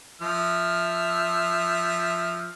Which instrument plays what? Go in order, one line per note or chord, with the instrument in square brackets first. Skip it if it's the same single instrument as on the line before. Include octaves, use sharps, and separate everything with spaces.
[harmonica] F3 E5 F6